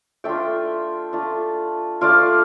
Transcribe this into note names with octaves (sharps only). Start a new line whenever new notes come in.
A3 D4 F4 E5 G5
A3 D4 F4
A3 D4 F4 D5 F5